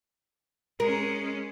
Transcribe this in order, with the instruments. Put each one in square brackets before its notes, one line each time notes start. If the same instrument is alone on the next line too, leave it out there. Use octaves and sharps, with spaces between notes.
[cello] G#3 C#4 [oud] A#4